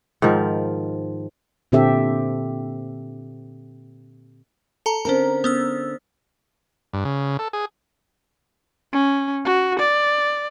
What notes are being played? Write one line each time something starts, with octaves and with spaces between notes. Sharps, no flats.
G#2 D#3 F3
A#2 D3 C4 G4 A4 E5
A4 A5 A#5
D3 C4 C#4 A#4 A#5
B3 C#4 E6
G2
C#3
A4
G#4
C#4
F#4
D5